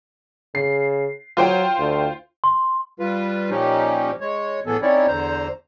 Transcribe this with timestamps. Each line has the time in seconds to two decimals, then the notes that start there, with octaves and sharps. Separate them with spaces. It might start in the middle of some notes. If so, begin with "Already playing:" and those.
0.55 C#3 C7
1.37 F#3 F4 C5 G5
1.78 D2
2.44 C6
3.00 G3 F4 B4
3.50 A#2 F3 C#4 D#4 G4
4.21 G#3 C#5
4.66 A2 E3 B3 G#4 A4
4.82 C4 C#4 D#4 E4 C#5 D5
5.08 E2 D3 C5 A#5